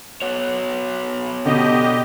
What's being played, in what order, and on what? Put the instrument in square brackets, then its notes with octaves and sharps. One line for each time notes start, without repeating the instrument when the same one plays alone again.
[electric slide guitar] B3 F#4 C#5
[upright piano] B2 D3 [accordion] G4 D#5